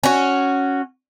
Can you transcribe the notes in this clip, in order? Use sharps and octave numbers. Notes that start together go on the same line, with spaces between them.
C#4 F#4